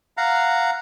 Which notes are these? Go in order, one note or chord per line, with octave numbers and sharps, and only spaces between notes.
F5 F#5 A#5